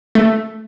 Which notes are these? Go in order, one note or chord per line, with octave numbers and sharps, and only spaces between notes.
A3